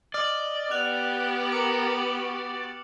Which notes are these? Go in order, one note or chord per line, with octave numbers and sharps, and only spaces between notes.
D5 D#5 F6 F#7
B3 G4 F#5 F#6 F7
A#4 D6 C#7 F#7
F#4